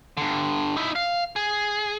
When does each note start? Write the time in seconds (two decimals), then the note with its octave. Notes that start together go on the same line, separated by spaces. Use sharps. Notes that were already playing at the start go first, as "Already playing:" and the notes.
0.17 G2 D3
0.77 D#4 E4
0.96 F5
1.36 G#4